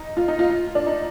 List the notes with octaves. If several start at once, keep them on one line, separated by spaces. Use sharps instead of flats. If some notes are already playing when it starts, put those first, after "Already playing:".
Already playing: D#4
F4
D#4
F4
F4
D4
D#4